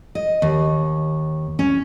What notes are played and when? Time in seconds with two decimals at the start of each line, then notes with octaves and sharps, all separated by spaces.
0.15 D#5
0.42 D#2
1.59 C#4